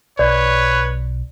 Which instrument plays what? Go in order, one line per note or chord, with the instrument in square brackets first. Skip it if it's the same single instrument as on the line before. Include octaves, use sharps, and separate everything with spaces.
[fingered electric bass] B1 [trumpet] B4 [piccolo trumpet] C#5 [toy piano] D5